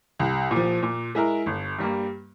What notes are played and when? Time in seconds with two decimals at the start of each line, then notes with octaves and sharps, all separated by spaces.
0.19 C2
0.51 A#2 F3
0.82 A#2
1.15 G#3 E4 A#4
1.46 G1
1.78 G2 G3 A#3